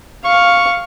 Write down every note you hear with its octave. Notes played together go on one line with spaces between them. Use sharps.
F5 C#6